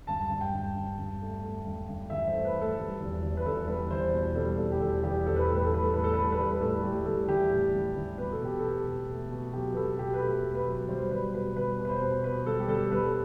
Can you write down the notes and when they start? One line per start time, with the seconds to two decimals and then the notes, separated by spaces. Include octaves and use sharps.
0.07 G2 A5
0.30 G2
0.41 G5
0.53 G2
0.76 G2
0.98 G2
1.21 A3
1.43 A3
1.66 G2
1.88 G2
2.10 E3 E5
2.28 C5
2.33 A3
2.45 B4
2.56 A3
2.61 A4
2.78 G3
3.00 E2
3.23 E2
3.37 B4
3.45 E2 A4
3.67 G3 B4
3.90 E2 C5
4.13 B2
4.35 G3 A4
4.58 G3 A4
4.72 G4
4.80 E2 A4
5.03 E2 G4
5.26 E2 A4
5.36 B4
5.45 A2 A4
5.54 B4
5.64 A4
5.71 G3 B4
5.83 A4
5.93 A2 B4
6.04 A4
6.13 G3 B4
6.23 A4
6.32 B4
6.38 G3 A4
6.51 B4
6.60 A2 A4
6.83 G3 G4
7.06 G3 A4
7.28 E3 G4
7.51 A2
7.74 G3
7.95 E3
8.18 B2 B4
8.32 A4
8.41 B2 G4
8.59 B2 A4
8.86 B2
9.09 A3
9.31 B2
9.53 F#3 G4
9.72 B4
9.75 B2 A4
9.99 B2 G4
10.14 B4
10.21 A3 A4
10.44 B2
10.55 B4
10.66 F#3
10.88 G3 C5
11.11 G3 B4
11.33 B2 B4
11.56 G3 B4
11.79 B2
11.85 B4
11.89 C5
12.01 B2
12.24 B2 B4
12.46 G3 A4
12.60 G4
12.68 G3 A4
12.92 G3 B4
13.05 A4